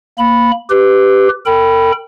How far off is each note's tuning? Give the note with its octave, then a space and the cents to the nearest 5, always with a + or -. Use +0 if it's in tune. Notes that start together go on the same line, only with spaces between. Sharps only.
A#3 +0 B5 +0
G4 +0 B4 +20
A#4 -45 G5 +0 B5 +0